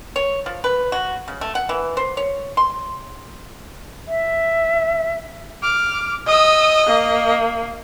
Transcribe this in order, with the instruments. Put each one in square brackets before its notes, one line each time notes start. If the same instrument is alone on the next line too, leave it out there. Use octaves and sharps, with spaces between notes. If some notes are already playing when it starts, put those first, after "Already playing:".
[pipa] C#5
F3
B4
F#4
C#3
A3
F#5
E3
C5
C#5
C6
[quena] E5
[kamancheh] D6 F6
[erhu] D#5 [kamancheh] D#6 E6
[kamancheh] A#3